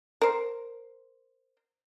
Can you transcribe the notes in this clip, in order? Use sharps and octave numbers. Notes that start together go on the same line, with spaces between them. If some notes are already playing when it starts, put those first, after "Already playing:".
A#4 C5